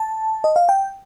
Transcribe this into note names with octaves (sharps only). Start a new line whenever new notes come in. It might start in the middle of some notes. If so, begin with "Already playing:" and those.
Already playing: A5
D#5
F5
G5